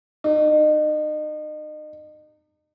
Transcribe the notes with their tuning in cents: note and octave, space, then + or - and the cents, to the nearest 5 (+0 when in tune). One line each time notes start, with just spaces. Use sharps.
D#4 -35